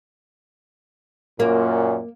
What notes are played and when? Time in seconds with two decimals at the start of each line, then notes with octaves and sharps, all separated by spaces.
1.40 F#2 A#2 A#3